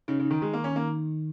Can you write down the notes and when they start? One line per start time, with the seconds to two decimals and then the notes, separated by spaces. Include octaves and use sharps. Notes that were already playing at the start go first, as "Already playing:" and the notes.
0.08 C#3 D#4
0.20 C#3
0.25 D#4
0.31 D#3
0.41 D#3 G#3
0.53 A#3
0.59 D#3
0.64 C#4
0.76 A#3